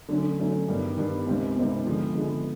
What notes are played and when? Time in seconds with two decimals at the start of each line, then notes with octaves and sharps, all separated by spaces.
0.08 D3 F#3 A3 C#4
0.39 D3 F#3 A3 C#4
0.68 G2 D#3 G3 B3
0.97 G2 D#3 G3 B3
1.26 C#2 C3 D#3 G3 C4
1.56 C#2 C3 D#3 G3 C4
1.86 D3 F3 G#3 B3
2.15 D3 F3 G#3 B3